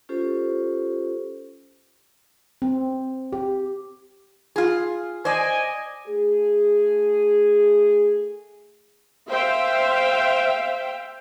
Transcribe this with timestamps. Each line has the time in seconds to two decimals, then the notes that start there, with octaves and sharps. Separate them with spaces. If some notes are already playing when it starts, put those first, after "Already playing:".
0.09 C#4 F4 G4 A4 C5
2.62 C4
3.33 G4
4.56 F4 G#4
5.25 C5 D5 D#5 G#5
6.07 A3 G#4
9.30 C5 E5 F5 G5